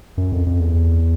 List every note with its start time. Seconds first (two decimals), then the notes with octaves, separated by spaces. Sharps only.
0.18 F#2
0.32 F2
0.46 F2
0.60 E2